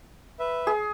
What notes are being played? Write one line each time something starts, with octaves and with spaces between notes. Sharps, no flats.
B4 E5
G#4